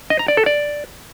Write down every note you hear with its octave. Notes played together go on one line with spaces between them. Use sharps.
D#5
A#5
D5
A4
D5